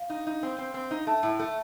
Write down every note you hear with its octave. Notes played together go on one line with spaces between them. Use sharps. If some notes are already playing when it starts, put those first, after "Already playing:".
Already playing: F5
D#4
D#4
C4
C4
C4
D#4
A3 A5
A2
A3